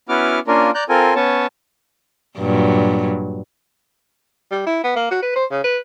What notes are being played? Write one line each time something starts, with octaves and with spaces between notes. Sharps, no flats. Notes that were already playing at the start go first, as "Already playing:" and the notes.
B3 C#4 E4 F#4 D6 F6
A#3 C#4 D4 F4 A#4
D5 A#5 F#6 G6
C4 F4 A4 A#4 G#5
B3 C#4 C#5 A5
G2 A#2 F#3
G3
E4
B3
A#3
F#4
B4
C5
C#3
B4